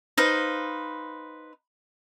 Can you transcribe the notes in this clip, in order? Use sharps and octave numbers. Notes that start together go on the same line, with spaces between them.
D#4 B4 C5 F5